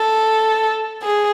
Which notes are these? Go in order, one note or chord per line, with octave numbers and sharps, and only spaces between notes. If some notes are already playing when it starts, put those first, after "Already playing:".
Already playing: A4
G#4